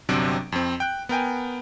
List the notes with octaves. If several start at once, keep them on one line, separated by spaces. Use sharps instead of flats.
G1 C3 F#3 C4 D4 D7
F2 C4
G5 F#6
B3 A#4 G5 G#5